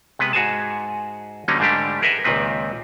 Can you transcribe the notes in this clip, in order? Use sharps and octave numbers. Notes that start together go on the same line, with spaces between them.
C3 G#3 B3 B4
G#2 F#4 G#4 G#5 A5
D3 F#3 G3 A#3 C#4 D#4
G#2 D3 G3 A3 D4 G4
G#4 A#4 B4 D#5 E5 F#5
C#2 A#2 D#3 C4 B4